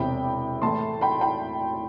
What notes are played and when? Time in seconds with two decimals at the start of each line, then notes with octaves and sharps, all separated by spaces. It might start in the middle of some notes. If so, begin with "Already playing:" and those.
Already playing: E1 E2 C3 G5 B5
0.62 A2 E3 A3 E4 A5 C6
1.01 G5 B5
1.21 G5 B5